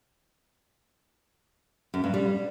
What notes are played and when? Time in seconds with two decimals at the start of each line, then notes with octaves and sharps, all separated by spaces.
1.94 F#2
2.04 G2
2.14 G3